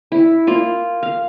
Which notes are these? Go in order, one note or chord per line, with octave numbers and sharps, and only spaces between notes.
E4
A#3 F4
F5